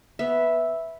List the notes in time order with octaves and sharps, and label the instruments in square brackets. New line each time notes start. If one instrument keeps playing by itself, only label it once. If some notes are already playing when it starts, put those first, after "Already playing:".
[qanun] B3 E5